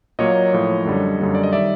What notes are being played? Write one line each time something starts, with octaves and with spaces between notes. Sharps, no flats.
A#2 F#3 A#3 C#5 D#5
A2 F3 A#3
F#2 D3 G3
F#2 D3 G3 A#3
D5
D#5
D#3 G3 D5 E5